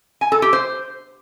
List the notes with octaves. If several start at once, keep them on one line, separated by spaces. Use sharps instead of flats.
G#5
A4
G4
C5